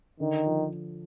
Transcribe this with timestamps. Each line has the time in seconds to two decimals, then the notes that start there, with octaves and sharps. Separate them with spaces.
0.20 D3 D#3
0.46 F3